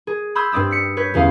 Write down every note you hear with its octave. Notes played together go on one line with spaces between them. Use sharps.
G#4
B5 C6 D#6 E6 G6 G#6
G2 C4 D5 D#6 E6
B6 C#7
B4 C#5 G6 B6
G1 E2 C#4 F5 D#6